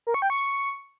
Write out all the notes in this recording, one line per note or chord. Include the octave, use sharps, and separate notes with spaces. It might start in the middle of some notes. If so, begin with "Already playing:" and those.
A#4
C#6
G5
C#6